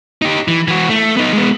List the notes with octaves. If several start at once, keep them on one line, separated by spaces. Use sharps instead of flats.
D#4 G4
E3
E3 F#4
A3
B3 D#4
G#3 B3